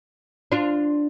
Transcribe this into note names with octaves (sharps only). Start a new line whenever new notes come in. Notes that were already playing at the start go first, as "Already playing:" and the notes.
D4 F4